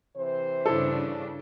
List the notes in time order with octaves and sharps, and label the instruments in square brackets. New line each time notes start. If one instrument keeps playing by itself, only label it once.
[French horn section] C3 E3 C5
[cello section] G2 C#3 D4 [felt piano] E4 A4